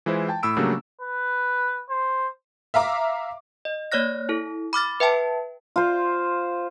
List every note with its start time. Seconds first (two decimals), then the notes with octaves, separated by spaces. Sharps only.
0.06 E3 G#3 E4 F4 C5
0.29 G5 A5
0.43 A2 B5 E6 D7
0.56 C#3 F#3 G3 A3 A#3 D4
1.02 B4
1.90 C5
2.74 E5 F5 A#5 D6
3.65 D#5
3.92 A#3 C#5 D5 F6 F#6 A#6
4.29 E4 A4
4.73 B5 D6 F6 A6
5.00 B4 E5 G5 A5
5.76 F4 C5